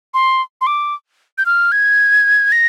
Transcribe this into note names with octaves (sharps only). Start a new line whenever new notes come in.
C6
C6
D6
G6
F6
G#6
A#6